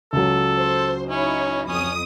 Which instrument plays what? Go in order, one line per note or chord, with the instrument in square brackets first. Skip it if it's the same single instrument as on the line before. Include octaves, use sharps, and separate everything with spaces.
[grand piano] C#2 F#3 [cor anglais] A4
[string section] C5
[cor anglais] C#4 [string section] D#4 E4 C#5
[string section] F2 D#6 [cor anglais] C#4